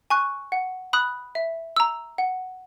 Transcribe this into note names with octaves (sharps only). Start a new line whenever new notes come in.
G#5 C#6 F#6
F#5
B5 D#6 F#6
E5
A#5 E6
F#5